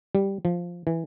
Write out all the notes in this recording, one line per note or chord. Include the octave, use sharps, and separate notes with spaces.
G3
F3
E3